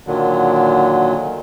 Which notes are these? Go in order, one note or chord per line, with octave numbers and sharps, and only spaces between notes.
A#2 D3 D#3 F#3